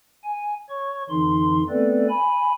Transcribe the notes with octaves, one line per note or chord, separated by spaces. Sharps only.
G#5
C#5 C#6
F2 D3 E3 D#4 C6
A3 B3 C4 A4 B4 D5
G#5 B5